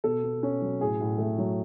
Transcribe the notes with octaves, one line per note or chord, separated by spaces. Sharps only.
B2 A4
B2
C#4
F#3
A2 G#4
A2
A3
F#3